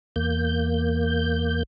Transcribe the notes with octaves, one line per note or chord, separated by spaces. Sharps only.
E2 A#3 G6